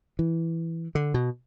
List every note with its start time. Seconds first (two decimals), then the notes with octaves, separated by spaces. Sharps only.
0.19 E3
0.95 D3
1.14 B2